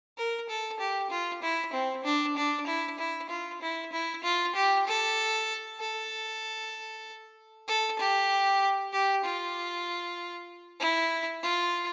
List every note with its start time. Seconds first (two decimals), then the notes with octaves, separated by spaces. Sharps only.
0.17 A#4
0.49 A4
0.79 G4
1.10 F4
1.42 E4
1.73 C4
2.04 D4
2.37 D4
2.67 E4
2.99 E4
3.30 F4
3.62 E4
3.93 E4
4.24 F4
4.55 G4
4.87 A4
5.80 A4
7.68 A4
7.99 G4
8.93 G4
9.24 F4
10.80 E4
11.43 F4